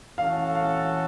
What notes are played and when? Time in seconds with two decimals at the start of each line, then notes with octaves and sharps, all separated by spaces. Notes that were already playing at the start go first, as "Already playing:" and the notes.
0.18 E3 A3 C#4 F#4 A4 F5
0.55 F5